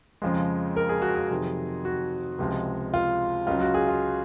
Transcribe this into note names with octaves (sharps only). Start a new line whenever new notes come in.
F2 C#3 F3 G#3
A#4
G#4
F#4
G#4
F2 C3 D#3 F#3
F#4
C#2 C3 F3 G#3
F4
C#2 C#3 F#3 F4
F#4
G#4
F4